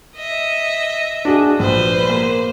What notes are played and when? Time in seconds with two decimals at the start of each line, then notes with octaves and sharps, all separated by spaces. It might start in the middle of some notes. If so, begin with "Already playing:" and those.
0.16 D#5 E5
1.25 D4 F#4 G#4
1.59 A#1 B4 C5
2.10 A#3